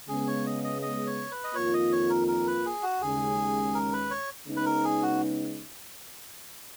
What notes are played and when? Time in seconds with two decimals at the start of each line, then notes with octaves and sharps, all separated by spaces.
0.08 C#3 G#3 B3 G#4
0.27 C#5
0.46 D#5
0.64 D#5
0.82 D#5
1.07 C#5
1.31 B4
1.44 D#5
1.55 F2 D#3 A#3 F4 C#5
1.74 D#5
1.92 C#5
2.10 A#4
2.28 A#4
2.47 B4
2.66 G#4
2.83 F#4
3.02 D#2 C#3 G#3 G#4
3.75 A#4
3.93 B4
4.11 C#5
4.48 C#3 G#3 B3 D#4
4.57 B4
4.66 A#4
4.84 G#4
5.03 F#4